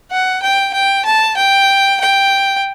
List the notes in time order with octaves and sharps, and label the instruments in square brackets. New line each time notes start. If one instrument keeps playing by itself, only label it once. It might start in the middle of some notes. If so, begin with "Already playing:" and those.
[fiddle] F#5
G5
G5
A5
G5
G5